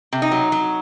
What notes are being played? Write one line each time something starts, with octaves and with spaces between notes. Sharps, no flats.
C3
D#4
F#3
F#3